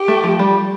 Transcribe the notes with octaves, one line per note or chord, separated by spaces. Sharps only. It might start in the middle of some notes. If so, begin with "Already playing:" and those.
Already playing: G4
A3
F3
G3